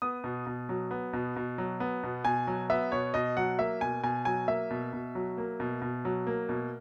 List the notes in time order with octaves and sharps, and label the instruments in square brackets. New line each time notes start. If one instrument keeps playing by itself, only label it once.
[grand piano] B3 D#6
B2
B2
F#3
B3
B2
B2
F#3
B3
B2
B2 G#5
F#3
B3 E5
B2 C#5
B2 D#5
F#3 F#5
A#3 E5
B2 G#5
B2 G#5
F#3 G#5
A#3 E5
B2
B2
F#3
A#3
B2
B2
F#3
A#3
B2